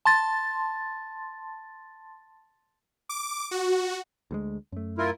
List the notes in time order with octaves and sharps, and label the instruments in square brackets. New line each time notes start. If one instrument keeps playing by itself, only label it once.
[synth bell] A5 C6 A6
[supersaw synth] D6
F#4
[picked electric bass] D2 G3 G#3
F#2 A3
[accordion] E4 F4 A#4